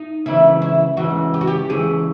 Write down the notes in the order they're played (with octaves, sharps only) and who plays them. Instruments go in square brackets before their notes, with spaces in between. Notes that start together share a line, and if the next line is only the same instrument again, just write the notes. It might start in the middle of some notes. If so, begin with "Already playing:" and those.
Already playing: [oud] D#4
[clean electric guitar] C#2 C#3 E3 [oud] E4
[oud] E4
[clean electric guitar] C#2 C#3 E3 [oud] F#4
[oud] G4
F#4
G4
[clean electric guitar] C#2 C#3 E3 [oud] G#4